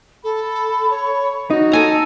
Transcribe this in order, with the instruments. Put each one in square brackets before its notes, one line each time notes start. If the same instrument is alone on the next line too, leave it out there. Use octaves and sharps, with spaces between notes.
[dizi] A4 [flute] B5
[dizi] C#5
[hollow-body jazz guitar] D#4 [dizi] F#4
[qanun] A4 G#5 A#5 [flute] E6